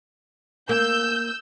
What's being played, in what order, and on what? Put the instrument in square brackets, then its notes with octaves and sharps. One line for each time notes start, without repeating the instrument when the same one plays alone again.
[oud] A#3 [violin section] E6 G6